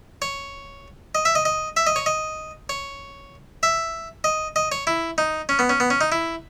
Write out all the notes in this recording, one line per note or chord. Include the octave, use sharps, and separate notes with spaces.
C#5
D#5
E5
D#5
D#5
E5
D#5
C#5
D#5
C#5
E5
D#5
D#5
C#5
E4
D#4
C#4
B3
C#4
B3
C#4
D#4
E4